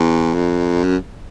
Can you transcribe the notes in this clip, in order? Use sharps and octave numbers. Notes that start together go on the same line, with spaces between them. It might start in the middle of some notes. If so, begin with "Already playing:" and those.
Already playing: E2
F2
F#2